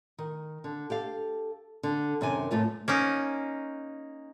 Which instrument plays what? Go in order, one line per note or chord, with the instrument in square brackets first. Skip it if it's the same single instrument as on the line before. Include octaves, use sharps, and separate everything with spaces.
[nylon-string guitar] D#3
D3
G4 A4 F5
D3
F#2 C3 D#3 G#5
F#2 A2 A3 F4 B4
[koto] A#3 C#4 D#4